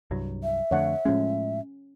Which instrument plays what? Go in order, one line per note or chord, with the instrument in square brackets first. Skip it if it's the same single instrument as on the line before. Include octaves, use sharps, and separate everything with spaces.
[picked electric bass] C2 G2 F#3
[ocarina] E5
[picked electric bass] F2 D3 A3 [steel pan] C#5 F#5
[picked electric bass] A2 F3 G#3 [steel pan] C#4